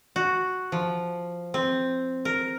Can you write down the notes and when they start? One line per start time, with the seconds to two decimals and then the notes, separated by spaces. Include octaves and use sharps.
0.16 F#4
0.72 F3
1.54 C4
2.25 A#4